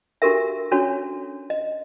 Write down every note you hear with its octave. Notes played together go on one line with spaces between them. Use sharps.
D4 F#4 G4 A4 A#4 E5
C#4 D4 F#4 A4 C#5
D#5